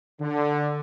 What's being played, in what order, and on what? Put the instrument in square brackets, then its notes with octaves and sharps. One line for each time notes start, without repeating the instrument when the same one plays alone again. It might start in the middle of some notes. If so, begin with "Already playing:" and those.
[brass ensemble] D3